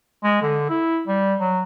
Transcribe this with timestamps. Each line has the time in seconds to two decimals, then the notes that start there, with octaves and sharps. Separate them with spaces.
0.24 G#3
0.42 D3
0.70 E4
1.07 G3
1.40 F#3